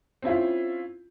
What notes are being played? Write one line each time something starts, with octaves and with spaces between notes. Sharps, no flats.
C4 C#4 E4 F4